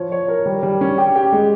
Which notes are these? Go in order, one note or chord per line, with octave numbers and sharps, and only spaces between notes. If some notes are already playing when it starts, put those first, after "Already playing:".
Already playing: F3 C#5
C#5
A#4
G3
G3
C#4
G4
G4
G#3